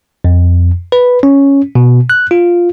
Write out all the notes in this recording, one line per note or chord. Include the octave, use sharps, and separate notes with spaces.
F2
B4
C#4
B2
F#6
F4